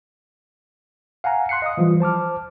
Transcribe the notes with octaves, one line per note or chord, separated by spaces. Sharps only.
F5 F#5 G#5 A#5
C6 F#6 C7 C#7
D#5 F5 D#6
E3 F3 G3 F4
C5 A5 D6 F6